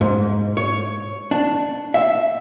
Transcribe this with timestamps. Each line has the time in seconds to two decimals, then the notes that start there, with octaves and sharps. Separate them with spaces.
0.01 G#2
0.57 C#5
1.31 D4
1.94 E5